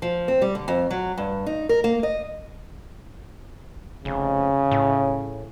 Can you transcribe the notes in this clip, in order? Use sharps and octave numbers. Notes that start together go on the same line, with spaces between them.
F3
C4
G3
D3
F2
F#3
G2
D#4
A#4
A#3
D#5
F1 C#3
A2